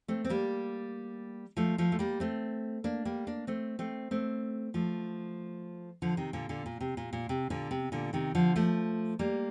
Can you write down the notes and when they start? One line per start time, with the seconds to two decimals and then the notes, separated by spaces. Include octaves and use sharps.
0.08 A3 C4
0.24 C4
0.29 G3 A#3
1.56 F3 A3
1.78 F3 A3
1.92 A3
1.99 G3 A#3
2.20 A3 C4
2.84 A#3 D4
3.05 G3 A#3
3.27 A#3 D4
3.47 A3 C4
3.79 A3 C4
4.11 A3 C4
4.74 F3 A3
6.02 D3 F3
6.17 C3 D#3
6.33 A#2 D3
6.49 A#2 D3
6.66 A#2
6.80 C3
6.97 A#2
7.13 A#2
7.29 C3
7.50 A#2 D3
7.71 C3
7.92 A#2 D3
8.13 C3 D#3
8.35 D3 F3
8.56 F3 A3
9.19 G3 A#3